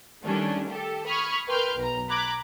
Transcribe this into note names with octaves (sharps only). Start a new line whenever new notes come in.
D#3 G3 A3 C#4 D4
G4 A4
B5 C#6 D#6 F6 G#6
A#4 B4 G5 C6 F6 G6
B1 A#5
A#5 B5 D6 F#6 G#6